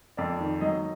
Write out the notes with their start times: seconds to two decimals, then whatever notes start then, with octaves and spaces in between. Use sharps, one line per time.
0.17 F2 D5
0.40 D#3
0.61 F#3 D#5